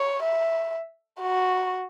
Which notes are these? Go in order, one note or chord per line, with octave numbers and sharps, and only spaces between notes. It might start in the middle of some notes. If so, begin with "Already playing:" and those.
Already playing: C#5
E5
F#4